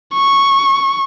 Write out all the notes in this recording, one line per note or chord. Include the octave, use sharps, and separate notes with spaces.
C#6